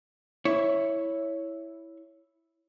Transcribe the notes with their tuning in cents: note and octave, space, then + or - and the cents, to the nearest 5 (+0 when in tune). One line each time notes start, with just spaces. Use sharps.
E4 +0 C#5 +0